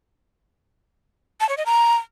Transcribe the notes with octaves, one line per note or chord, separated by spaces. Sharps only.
A5
C#5
D#5
A#5